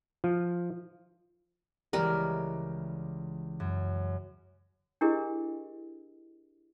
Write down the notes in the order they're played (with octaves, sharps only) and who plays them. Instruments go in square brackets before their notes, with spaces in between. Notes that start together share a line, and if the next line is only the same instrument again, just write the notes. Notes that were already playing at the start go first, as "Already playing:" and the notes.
[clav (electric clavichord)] F3
[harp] C#2 E3 G#3 [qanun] G3 A#4
[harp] F#2
[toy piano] D4 E4 G4 G#4 A#4 D#5